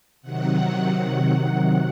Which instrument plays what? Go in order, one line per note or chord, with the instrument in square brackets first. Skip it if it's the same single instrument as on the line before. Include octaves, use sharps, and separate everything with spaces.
[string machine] C3 D#3 F#3 F#5